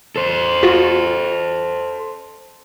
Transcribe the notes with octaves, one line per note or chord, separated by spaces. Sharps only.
A4 C5
F4 F#4